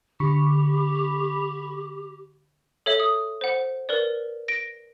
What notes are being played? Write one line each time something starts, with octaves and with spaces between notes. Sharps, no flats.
D3 G4 B5 C#6
A4 C#5 E5
D#6
C5 F#5
A#4 B4 D5
A#6 D7